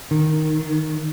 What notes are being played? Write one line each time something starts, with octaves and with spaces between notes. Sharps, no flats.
D#3